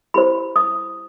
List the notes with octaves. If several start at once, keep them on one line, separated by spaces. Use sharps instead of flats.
E4 G4 C5 B5
D#6